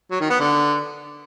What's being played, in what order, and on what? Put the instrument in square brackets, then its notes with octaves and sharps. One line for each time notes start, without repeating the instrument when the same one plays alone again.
[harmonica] F#3
D#3
B3
D3